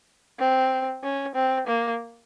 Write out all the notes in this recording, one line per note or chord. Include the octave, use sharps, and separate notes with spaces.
C4
C#4
C4
A#3